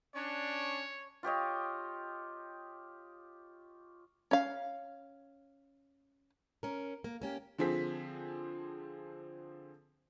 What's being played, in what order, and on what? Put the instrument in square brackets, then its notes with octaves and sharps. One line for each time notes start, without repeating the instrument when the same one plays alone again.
[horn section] C#4 D4 [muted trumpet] C#5
[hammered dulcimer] F4 G4 C#5 D#5
[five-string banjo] C#4 F5
[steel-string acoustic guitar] C#4 A#4
A#3
A#3 C#4 G4
[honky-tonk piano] D3 F3 C4 G#4 B6